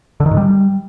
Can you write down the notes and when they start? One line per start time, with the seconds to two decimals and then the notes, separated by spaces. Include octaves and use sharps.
0.20 D3
0.26 D#3
0.31 G#2
0.37 G3